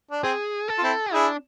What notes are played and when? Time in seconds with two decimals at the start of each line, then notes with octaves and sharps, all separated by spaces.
0.11 D4
0.23 C4 G#4
0.68 A4
0.78 F4
0.83 C4 E4
1.13 D4 E4 G#4